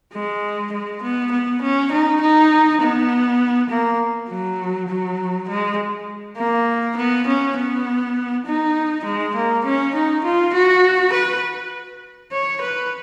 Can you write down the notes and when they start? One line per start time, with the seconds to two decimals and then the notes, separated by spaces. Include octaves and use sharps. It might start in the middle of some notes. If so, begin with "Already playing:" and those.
0.13 G#3
0.73 G#3
1.03 B3
1.32 B3
1.62 C#4
1.92 D#4
2.21 D#4
2.81 B3
3.70 A#3
4.30 F#3
4.89 F#3
5.49 G#3
6.38 A#3
6.97 B3
7.27 C#4
7.57 B3
8.46 D#4
9.05 G#3
9.35 A#3
9.65 C#4
9.95 D#4
10.24 F4
10.54 F#4
11.13 B4
12.32 C#5
12.61 B4